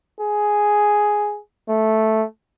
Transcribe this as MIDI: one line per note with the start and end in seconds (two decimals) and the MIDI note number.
0.20 1.38 68
1.69 2.24 57